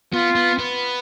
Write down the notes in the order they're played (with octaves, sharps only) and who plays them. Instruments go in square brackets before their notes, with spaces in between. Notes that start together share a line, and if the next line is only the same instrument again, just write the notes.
[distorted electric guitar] B3 [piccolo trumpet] F4
[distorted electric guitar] B3
B3